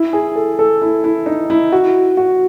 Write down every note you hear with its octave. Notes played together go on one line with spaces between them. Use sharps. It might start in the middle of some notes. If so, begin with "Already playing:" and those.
Already playing: E4
G#4
A4
A4
E4
E4
D#4
E4
F#4
F#4